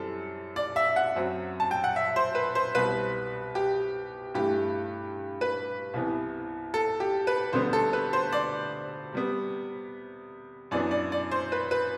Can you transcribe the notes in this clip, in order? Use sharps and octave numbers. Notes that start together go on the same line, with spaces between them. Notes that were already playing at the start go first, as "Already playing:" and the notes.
Already playing: F#2 E3 G3 C4 A4
D5
E5
F#5
F#2 F#3 C4
A5
G5
F#5
E5
C5
B4
C5
C2 B2 G3 C4 B4
G4
G2 E3 A3 G4
B4
C2 C3 E3 B3
A4
G4
B4
D2 D3 G3 B3 C5
A4
B4
C5
D5
C3 G3 B3
F#2 E3 B3 D4 D5
D5
D5
C5
B4
B4